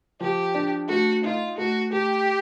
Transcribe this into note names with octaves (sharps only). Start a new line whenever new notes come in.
F3 G4
D4
A3 F#4
D#4 F4
A3 F#4
A3 G4